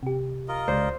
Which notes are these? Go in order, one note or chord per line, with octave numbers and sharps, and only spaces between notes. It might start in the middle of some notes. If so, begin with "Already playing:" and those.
C3 G4
F4 A#4 D#5
C#2 C5 D5